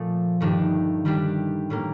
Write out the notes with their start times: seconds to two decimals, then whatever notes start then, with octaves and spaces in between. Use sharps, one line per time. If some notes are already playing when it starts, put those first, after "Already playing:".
Already playing: A#2 F3 A3
0.41 G2 D#3 A3 D4 G4
1.05 D#3 G3 D4 G4
1.70 A2 G3 A#3